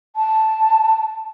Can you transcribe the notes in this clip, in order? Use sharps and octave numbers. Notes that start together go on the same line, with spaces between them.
A5